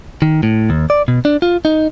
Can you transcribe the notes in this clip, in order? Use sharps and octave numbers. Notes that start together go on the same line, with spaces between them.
D#3
A2
D#2
D5
B2
D4
F4
D#4